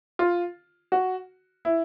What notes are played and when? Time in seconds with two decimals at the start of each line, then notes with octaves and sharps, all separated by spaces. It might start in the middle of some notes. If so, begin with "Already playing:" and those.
0.19 F4
0.92 F#4
1.65 E4